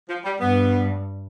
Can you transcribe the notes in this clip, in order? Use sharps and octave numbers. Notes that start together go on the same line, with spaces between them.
F3
G3
G2 B3